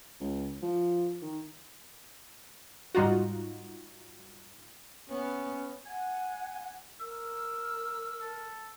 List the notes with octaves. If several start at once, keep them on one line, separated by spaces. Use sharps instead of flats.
C#2
F3
D#3
G#2 G3 D#4 F4 F#4
B3 C#4
F#5 G#5
A#4 E6
A4